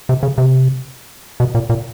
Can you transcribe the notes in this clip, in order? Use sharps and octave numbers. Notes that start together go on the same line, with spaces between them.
C3
C#3
C3
B2
A#2
A#2